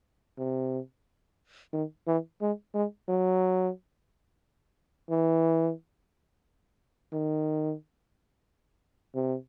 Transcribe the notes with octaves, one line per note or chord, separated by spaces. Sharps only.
C3
D#3
E3
G#3
G#3
F#3
E3
D#3
C3